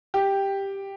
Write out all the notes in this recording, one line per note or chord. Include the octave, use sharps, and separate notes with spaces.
G4